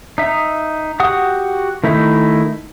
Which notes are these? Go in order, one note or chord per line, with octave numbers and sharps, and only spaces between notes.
D#4 E5
F#4 G4 F#5 D#6
D#3 A3 D#4 E4